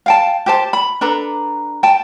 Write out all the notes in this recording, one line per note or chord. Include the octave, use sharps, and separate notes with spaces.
F5 G5 A5
G4 C5 A5
B5
D4 A4 B4 A#5
G5 A5